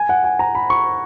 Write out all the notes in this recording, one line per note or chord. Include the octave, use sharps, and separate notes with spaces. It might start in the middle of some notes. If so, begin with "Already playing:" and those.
Already playing: G#5
F#5
G#5
A#5
B5
C#6